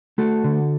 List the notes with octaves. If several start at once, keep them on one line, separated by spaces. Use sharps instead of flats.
A3 F#4 A4
D3